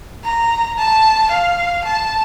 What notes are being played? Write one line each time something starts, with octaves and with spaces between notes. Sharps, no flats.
A#5
A5
F5
A5